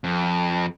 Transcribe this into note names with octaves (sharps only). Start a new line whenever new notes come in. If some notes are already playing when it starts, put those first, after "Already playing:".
F2